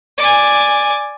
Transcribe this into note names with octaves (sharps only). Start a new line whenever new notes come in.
D5 G#5